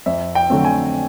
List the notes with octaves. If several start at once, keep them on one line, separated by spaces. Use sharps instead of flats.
F2 E5
G5
D3 F#3 A3 C4
G#5